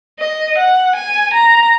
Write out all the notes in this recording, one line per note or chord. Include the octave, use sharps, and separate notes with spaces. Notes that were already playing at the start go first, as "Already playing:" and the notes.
D#5
F#5
G#5
A#5